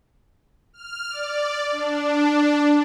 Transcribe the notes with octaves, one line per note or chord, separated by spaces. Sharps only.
F6
D5
D4